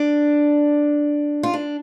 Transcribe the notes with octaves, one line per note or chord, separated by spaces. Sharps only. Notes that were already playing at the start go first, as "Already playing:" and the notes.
Already playing: D4
F4
D4